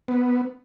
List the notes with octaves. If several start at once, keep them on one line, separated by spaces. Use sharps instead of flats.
B3